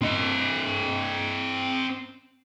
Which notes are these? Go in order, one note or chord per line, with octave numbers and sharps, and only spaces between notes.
C4 D#5